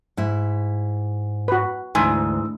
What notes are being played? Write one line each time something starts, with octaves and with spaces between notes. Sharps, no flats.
G#2 E4
F#4 B4
D2 G#2 E3 G#5